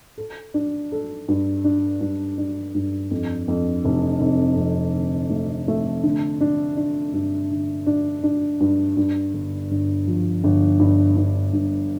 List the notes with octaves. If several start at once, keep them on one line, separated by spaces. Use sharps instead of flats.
A4
D4
A4
G2
D4
G2
D4
G2
F2
F2
F1
F1
F2
D3
A3
A3
D3
D4
D4
G2
D3
D4
D4
G2
G2
G1
G1
F3
G1
G2
G2
G2